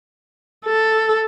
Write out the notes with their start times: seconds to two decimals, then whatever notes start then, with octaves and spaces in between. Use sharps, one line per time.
0.65 A4